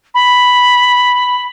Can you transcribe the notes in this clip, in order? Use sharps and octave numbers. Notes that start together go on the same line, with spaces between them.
B5